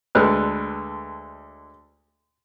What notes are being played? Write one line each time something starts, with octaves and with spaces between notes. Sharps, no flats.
D2 G#3 A4 B4 F6 F#6